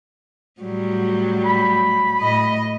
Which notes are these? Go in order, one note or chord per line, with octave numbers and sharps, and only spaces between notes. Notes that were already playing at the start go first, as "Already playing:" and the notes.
A2 F#3 G3
B5
A2 D#5